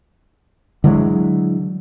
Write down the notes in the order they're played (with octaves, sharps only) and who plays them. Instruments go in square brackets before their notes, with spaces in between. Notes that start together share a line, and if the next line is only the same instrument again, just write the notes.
[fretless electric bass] D3 E3 F#3 G#3